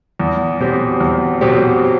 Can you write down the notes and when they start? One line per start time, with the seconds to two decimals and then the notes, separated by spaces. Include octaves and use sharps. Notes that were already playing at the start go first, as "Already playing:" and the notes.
0.20 E2
0.60 B2 F#3 C4 G4
1.00 E2
1.41 B2 F#3 C4 G4